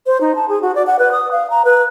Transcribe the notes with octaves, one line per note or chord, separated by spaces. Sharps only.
C5
D#4
A5
G#4
F#4
D5
F#5
B4
D#6
F5
A#5
B4